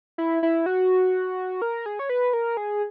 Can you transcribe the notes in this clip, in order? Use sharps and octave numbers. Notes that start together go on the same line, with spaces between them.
E4
E4
F#4
A#4
G#4
C#5
B4
A#4
G#4